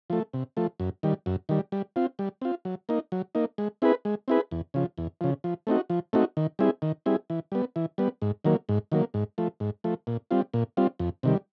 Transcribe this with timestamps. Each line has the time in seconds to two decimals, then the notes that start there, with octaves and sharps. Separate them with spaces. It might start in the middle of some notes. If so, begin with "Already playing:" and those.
0.10 F3 A3
0.33 C3
0.57 F3 A3
0.80 F#2
1.03 D#3 G3
1.26 F#2
1.49 D#3 G3
1.72 G3
1.96 C4 F4
2.19 G3
2.42 C4 F4
2.65 F#3
2.89 A#3 D#4
3.12 F#3
3.35 A#3 D#4
3.58 G#3
3.82 C4 E4 G#4 B4
4.05 G#3
4.28 C4 E4 G#4 B4
4.51 E2
4.74 C#3 F3
4.98 E2
5.21 C#3 F3
5.44 F3
5.67 A3 C4 D#4 F#4
5.90 F3
6.13 A3 C4 D#4 F#4
6.37 D#3
6.59 G3 C4 E4 G#4
6.82 D#3
7.06 G3 C4 E4 G#4
7.30 E3
7.52 G3 B3
7.76 E3
7.98 G3 B3
8.22 G#2
8.45 D#3 F#3 A#3
8.69 G#2
8.92 D#3 F#3 A#3
9.14 G#2
9.38 F3 A3
9.60 G#2
9.84 F3 A3
10.07 A#2
10.31 G3 C4 F4
10.54 A#2
10.77 G3 C4 F4
10.99 F2
11.23 C3 D#3 G3